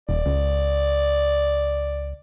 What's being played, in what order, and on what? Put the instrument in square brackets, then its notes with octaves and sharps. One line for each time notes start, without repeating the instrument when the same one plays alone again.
[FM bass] D#1 [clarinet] D5
[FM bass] C#2